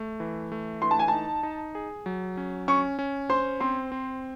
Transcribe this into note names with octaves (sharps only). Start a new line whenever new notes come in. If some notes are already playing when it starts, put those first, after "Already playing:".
Already playing: A3
E3
A3
E3 C6
A5
G#5
D#4 A5
D#4
G#4
F#3
C#4
C#4 C#6
C#4
C5 C6
C4 C6
C4